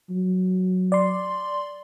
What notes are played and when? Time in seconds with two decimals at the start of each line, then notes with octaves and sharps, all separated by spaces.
0.10 F#3
0.92 D5 C6